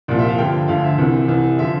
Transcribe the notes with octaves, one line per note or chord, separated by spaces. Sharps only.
C2 A#2 F3 D5
E5
F5
G2 D3 F3 G5
D2 D3 F3 F5
E5
C2 C3 E3
C2 C3 E3
D3 F3 E5